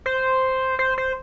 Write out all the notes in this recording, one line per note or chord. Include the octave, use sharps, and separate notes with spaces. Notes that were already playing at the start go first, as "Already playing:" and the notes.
C5
C5
C5